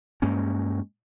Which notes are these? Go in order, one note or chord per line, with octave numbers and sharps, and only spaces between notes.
G2 G#3 A#3 C#4